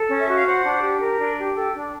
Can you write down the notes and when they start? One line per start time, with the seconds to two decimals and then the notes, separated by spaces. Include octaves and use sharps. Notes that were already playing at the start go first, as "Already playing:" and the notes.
Already playing: A4
0.09 C#4
0.19 E5
0.28 F#4
0.34 F5
0.46 C5 F#5
0.64 D4
0.82 G4
1.00 A#4
1.19 D4
1.38 G4
1.55 A4 G5
1.73 D4